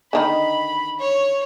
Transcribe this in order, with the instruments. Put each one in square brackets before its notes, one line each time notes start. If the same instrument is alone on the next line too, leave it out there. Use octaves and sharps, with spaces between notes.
[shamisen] D3 D#3 D#4 [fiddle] B5
[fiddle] C#5